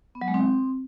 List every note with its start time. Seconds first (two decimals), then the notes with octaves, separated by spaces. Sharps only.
0.15 B3
0.21 F#3
0.28 G#3
0.34 C4